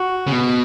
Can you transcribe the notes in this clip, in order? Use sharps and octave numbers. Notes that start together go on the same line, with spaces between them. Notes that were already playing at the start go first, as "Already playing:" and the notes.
Already playing: F#4
C#3
B2